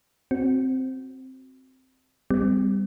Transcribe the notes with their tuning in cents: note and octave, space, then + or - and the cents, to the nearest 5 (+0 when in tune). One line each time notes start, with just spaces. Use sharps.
C4 +0 F#4 +0
G3 +15 C4 -40